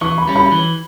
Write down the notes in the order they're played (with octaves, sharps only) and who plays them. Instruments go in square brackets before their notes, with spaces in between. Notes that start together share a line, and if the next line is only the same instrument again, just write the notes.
[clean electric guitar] E3 [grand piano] C#6
[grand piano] B5
[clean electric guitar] G3 C#4
[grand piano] B5
[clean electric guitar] E3